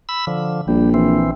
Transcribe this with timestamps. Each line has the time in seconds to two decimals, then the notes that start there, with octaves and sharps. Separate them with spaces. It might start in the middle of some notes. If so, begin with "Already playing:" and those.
0.09 B5 E6
0.27 D3 F3
0.68 A#1 G3
0.94 E3 C4